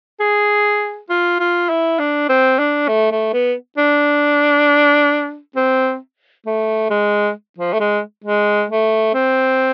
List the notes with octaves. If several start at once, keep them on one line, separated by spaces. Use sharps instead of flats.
G#4
F4
F4
E4
D4
C4
D4
A3
A3
B3
D4
C4
A3
G#3
F3
A3
G#3
G#3
A3
C4